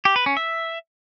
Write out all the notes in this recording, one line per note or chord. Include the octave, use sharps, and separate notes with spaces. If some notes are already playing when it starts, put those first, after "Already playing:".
G4
B4
C#4
E5